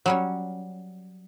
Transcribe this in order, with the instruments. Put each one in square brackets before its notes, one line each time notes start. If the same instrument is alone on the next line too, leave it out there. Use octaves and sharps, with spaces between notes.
[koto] F#3 G3 C#4